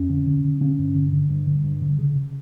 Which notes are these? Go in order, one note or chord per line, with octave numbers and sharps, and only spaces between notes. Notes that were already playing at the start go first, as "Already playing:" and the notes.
Already playing: F2 C#4
D3
D3
D3
D3 C#4
G2
D3
D3
G2
D3
G2
D3
C#3
C#3